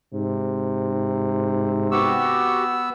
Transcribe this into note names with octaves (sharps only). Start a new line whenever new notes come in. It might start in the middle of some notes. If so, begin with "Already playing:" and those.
G#2 C3
B3 F#4 G4 C#6 E6